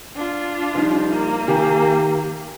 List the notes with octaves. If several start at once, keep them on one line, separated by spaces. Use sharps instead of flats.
D4 F4
F3 G3 D#4
A#3
D#3 G4 G#5